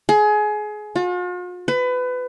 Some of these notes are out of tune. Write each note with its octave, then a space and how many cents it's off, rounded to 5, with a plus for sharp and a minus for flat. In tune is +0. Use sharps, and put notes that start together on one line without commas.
G#4 +25
F4 +45
B4 +25